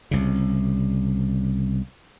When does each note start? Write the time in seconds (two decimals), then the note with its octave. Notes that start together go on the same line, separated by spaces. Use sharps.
0.11 C2 C#3